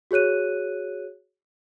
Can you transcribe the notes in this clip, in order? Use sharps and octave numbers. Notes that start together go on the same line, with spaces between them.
F#4 G#4 C#5 F#6 D#7